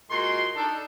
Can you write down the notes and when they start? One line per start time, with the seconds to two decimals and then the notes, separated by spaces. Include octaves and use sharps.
0.11 A#2 G#3 F#4 C6
0.56 D4 D#4 A4